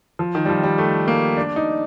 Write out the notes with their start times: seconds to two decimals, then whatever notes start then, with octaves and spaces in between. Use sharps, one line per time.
0.19 F3
0.35 D#3
0.45 G3
0.49 F3
0.63 G3
0.78 A3
1.08 A#3
1.37 D4
1.56 D#4